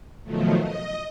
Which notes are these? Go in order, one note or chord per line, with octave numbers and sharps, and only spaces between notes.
B2 D#3 F3 F#3 A3
D#5